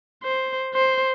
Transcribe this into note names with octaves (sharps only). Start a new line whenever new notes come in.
C5
C5